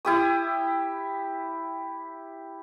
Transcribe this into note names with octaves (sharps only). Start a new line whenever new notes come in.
E4 G4 D#6